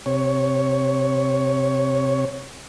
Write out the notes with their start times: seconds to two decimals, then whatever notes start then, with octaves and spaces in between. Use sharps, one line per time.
0.06 C3 C#5